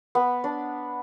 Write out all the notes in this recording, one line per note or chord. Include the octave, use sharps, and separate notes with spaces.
B3
D4